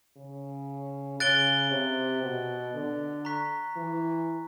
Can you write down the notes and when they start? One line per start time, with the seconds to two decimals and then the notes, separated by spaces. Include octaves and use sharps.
0.17 C#3
1.20 C#3 F#6 A6 D7 G7
1.71 C3
2.22 B2
2.74 D3
3.25 A#5 C#6 F#6 B6
3.77 E3